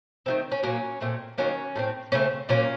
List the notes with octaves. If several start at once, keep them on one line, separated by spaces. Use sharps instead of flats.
D#3 F#3 A3 C4
C#4
A#2 F#3 A#3 C#4
A#2 A3 C4
D#3 F#3 A#3 C#4
A2 A3 C4
C#3 F3 A3 C4 C#4
A#2 F#3 A#3 C#4 F4